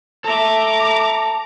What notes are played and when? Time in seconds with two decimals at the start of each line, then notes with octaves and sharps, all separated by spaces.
0.24 A4 E5 A#5 D6